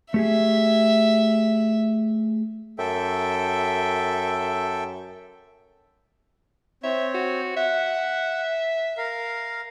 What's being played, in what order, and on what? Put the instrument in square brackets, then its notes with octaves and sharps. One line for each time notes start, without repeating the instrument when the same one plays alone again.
[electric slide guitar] A3 G4 G#4 [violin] E5
[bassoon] F#2 [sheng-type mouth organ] A4 E5 G5
[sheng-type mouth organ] C4 C#5 [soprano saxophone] E5
[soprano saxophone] F#4
[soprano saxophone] E5 [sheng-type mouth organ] F#5
[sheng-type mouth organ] A#4 F5